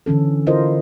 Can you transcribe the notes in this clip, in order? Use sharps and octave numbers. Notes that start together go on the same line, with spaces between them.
D3 E3 C#4 A4
E4 F4 A#4 C5 D#5